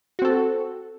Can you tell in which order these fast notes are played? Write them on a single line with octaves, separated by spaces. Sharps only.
F#4 C4 A4